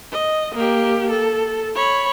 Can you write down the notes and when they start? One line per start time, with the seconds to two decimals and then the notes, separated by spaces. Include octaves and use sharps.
0.12 D#5
0.54 A#3 G4
1.10 A4
1.75 C#5 B5